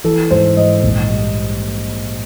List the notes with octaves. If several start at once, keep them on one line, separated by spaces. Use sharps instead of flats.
E3 A4
G#2 C5
G#2 D#5
A#1
G3